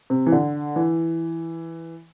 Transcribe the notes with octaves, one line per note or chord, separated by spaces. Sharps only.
C3
E3
D3
E3